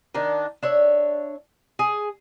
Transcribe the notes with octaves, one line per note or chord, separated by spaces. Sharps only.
D#3 D4
D4 C#5 E5
G#4